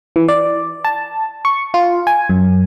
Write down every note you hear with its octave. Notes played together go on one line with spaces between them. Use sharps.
E3
D5
A5
C#6
F4
G#5
F#2